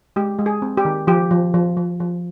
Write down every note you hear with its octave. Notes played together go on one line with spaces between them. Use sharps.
G#3 G4
G#3
G#4
C4
G4
D#3
F3 G4
F3
F3
F3
F3